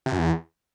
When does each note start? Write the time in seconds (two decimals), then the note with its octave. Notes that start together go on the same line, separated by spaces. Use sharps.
0.06 C3
0.12 F#2
0.19 E2